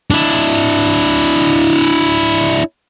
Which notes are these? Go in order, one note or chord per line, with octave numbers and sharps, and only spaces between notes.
D4 E4